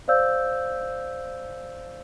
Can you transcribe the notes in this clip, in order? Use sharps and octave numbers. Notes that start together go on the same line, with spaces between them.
C5 D5 F5 E6 G6